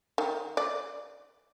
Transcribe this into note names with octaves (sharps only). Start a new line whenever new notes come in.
D#3
D5